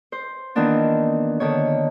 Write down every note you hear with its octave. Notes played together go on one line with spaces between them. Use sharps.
C5
D#3 E3 A#3 B3 D4 F4
D3 D#3 C#5